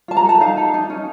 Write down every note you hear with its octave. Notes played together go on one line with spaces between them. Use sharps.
F4 A5
A#5
A4 A5
D#4 F5
A4
D#4
C#4